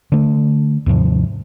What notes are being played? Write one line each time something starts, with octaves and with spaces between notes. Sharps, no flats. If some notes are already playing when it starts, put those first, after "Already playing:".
D3 A3
D#2 G#2 C3 F3